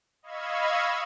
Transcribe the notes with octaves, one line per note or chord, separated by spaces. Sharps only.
D#5 F5 B5 C#6 E6 G#6